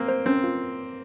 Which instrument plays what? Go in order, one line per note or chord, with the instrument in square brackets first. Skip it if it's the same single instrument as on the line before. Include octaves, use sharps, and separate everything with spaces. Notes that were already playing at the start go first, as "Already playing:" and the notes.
Already playing: [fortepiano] A#3 C4
[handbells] C5
[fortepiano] C4 [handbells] C#4
[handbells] F4